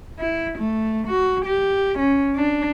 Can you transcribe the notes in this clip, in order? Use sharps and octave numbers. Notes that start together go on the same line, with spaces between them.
E4
A3
F#4
G4
C#4
D4